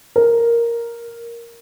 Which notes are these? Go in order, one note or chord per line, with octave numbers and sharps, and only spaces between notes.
A#4